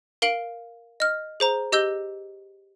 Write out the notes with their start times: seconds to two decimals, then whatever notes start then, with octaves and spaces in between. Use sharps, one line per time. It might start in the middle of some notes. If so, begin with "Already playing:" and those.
0.22 A#4 F5 D7 F#7
1.00 D#5 F6
1.40 G#4 C5 A#5
1.72 G4 D#5 E6 G6 G7